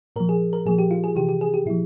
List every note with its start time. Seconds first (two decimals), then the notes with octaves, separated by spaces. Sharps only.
0.16 A#2 F3 A#4
0.29 G#4
0.53 A#4
0.66 A#2 F3 G#4
0.78 G4
0.91 F4
1.04 G#4
1.16 C3 E3 G4
1.29 G4
1.41 G#4
1.54 G4
1.66 A#2 F3 E4